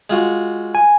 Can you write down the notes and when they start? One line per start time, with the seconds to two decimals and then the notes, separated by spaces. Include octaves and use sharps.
0.10 G#3 F4 F#4
0.75 G#5